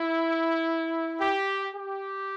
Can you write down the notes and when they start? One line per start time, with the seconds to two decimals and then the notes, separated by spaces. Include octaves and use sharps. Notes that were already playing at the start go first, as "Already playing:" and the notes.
Already playing: E4
1.21 G4
1.73 G4